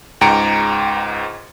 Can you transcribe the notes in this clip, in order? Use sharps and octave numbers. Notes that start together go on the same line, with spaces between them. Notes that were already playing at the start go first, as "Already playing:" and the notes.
C#2 G#2 G5 A#5 C#7 D7